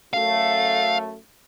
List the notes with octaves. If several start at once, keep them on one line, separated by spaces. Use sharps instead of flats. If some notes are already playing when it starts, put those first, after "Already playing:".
F#2 A3 F5